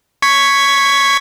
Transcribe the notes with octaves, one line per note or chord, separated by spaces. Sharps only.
C#6 G#6 B6